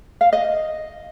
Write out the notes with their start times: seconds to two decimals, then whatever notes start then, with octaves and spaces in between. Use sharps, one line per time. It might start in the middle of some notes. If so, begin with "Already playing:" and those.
0.21 F5
0.33 D#5